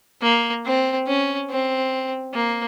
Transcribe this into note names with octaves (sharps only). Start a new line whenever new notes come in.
A#3
C4
C#4
C4
A#3